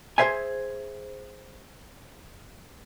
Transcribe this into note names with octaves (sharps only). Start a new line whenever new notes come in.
G#4 A#4 C5 E5 G#5